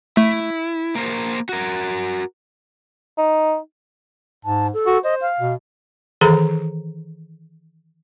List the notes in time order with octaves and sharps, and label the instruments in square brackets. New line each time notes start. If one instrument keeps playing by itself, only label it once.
[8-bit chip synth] A3 [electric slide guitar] E4
[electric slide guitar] A#3 A#4 C5
F#4 A#4
[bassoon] D#4
[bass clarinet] G#2 [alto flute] A5
[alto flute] A4
[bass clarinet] F#4
[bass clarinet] C5 [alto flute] D#5
[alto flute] F5
[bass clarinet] B2
[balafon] D#3 E3 G#4 A4 A#5